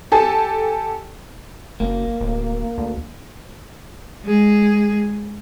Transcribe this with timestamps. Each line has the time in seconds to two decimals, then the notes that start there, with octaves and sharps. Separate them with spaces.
0.12 G4 A4 G#5 A5
1.80 F#1 A#3
2.21 D1
2.78 D2
4.24 G#3 G#4